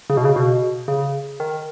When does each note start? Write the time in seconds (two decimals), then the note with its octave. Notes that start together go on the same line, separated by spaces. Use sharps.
0.10 C#3
0.17 B2
0.25 C#3
0.36 B2
0.88 C#3
1.40 D#3